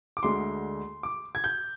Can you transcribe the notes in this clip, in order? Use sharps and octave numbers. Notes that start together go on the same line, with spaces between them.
D6
D2 D3 G#3 C6
D6
G#6
G6